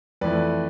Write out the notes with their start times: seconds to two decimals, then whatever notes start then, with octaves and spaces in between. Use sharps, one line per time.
0.21 F2 E3 A3 B4 D5